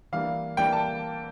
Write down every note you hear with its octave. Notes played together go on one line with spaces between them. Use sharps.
E3 G3 A#3 D4 F5
E3 G3 A#3 D4 G5
A5